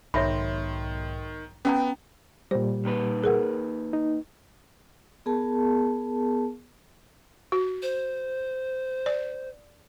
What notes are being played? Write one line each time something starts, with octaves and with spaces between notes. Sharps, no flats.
B1 G#2 D#3 C#5 E5 B5 C6
B3 C#4 F#5 G5 A#5
A#2 G3 C5
D#3 A#3 B4
G#4 A#4 F#5
D#4
B3 G#4 A#4 A5
F#4
C5
D5